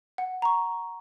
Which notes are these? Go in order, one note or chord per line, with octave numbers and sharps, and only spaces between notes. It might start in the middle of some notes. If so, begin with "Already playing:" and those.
F#5
A#5 C#6